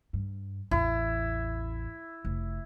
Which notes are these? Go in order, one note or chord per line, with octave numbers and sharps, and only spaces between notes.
G2
A1 E2 E4
F1